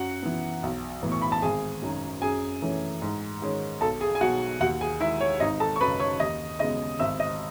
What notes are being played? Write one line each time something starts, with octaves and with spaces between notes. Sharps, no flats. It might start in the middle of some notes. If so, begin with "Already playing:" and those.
Already playing: F#2 F#4 F#5
E3 B3
B1
A2 E3 B3
C#6
B5
A5
G#1 G#4 G#5
F#2 D#3 F#3
F#2 G#4 G#5
E3 A3 C#4
G#2
D#3 G#3 C#4
B1 A4 A5
G#4 G#5
G#5
B2 F#3 F#4 F#5
D#2 F#4 F#5
G#4 G#5
D#3 G#3 E4 E5
C#5
G#1 D#4 D#5
A4 A5
C#6
F#2 C#3 B4 B5
C#5 C#6
D#2 D#5 D#6
C#3 G#3 B3 D#5 D#6
G#1 E5 E6
D#5 D#6